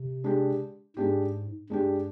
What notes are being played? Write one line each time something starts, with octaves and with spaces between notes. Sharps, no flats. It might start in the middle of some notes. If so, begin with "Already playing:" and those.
Already playing: C3
G#3 D4 G4
G#2 G#3 D4 G4
G2 G#3 D4 G4